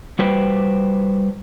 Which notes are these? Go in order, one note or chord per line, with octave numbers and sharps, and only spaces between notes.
G3 F#4 B4 C5 G5